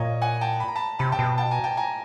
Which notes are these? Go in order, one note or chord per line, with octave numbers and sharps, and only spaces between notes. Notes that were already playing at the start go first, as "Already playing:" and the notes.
Already playing: A#2 C#5 D#5
F#5 G#5
G5 A5
B5
A#5
A5 B5
C3 A5 B5
G5 A5
B2
G5 A5
G#5 A#5
G5 A5
G#5 A#5